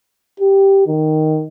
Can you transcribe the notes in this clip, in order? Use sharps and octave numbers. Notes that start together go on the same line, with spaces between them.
G4
D#3